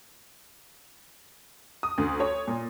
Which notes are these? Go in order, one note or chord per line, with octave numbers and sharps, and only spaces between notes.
D#6
D2
C#5
A#2